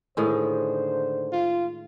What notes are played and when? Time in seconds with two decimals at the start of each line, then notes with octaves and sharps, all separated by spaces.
0.17 A2 D3 D#3 G#3 C5
1.32 F4